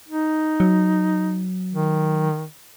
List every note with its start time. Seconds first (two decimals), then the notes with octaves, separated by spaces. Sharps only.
0.08 D#4
0.60 F#3
1.73 D#3